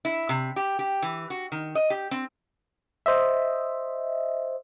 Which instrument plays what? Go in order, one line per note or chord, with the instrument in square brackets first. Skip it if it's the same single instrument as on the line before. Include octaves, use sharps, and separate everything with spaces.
[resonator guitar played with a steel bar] E4
C3
G4
G4
E3
F#4
D#3
D#5
G4
C4
[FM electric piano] C5 D#5 E5